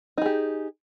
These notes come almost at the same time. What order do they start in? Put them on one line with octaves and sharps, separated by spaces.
D#4 G#4 G4